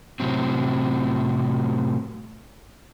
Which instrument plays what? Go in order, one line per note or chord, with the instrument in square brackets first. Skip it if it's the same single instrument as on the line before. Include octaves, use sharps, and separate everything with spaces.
[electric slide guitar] A2 C3 F#3 C4